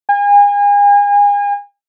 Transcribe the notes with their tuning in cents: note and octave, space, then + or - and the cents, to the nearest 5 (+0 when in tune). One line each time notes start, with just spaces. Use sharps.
G#5 -35